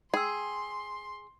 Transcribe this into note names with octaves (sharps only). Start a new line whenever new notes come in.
G#4 G5 C6 E6